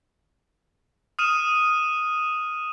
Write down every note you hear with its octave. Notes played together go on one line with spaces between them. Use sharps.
D#6 F6 D#7 E7